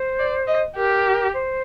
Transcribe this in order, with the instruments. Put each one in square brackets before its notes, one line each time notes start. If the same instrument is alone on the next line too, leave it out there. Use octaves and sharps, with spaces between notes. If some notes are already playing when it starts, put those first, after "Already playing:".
Already playing: [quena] C5
[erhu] D5
D#5
[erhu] G4 [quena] A#4
[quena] C5